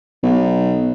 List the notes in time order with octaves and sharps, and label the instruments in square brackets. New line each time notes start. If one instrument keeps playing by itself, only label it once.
[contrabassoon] B1